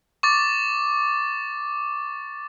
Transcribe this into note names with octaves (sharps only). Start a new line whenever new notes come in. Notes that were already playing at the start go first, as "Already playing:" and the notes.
C#6 D6 A6